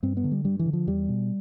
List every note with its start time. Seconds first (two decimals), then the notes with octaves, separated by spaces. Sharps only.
0.03 G2 C4
0.17 B3
0.24 D3
0.31 G3
0.45 G2 G3
0.59 E3
0.66 D3
0.73 F3
0.87 E2 G3
1.09 B2